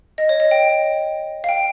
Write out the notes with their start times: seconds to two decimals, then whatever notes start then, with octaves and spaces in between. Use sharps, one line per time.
0.18 D#5
0.29 C#5
0.40 D#5
0.51 G5
1.44 F5
1.49 G5